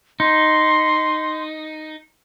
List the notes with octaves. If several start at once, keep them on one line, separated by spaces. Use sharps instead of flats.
D#4 C6